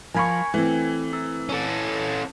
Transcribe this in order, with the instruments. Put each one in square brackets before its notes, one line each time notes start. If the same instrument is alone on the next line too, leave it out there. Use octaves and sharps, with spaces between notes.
[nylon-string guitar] F3 F4 [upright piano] A#4 B5 C#6 [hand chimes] G#5 G#6 C#7
[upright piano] E3 [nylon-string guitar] A3 C4
[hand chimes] E4 E6
[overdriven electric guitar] C#4 A4